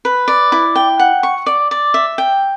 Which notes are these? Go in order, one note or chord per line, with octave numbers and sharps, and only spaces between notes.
B4
D5
E4
G5
F#5
C#6
D5
D5
E5
G5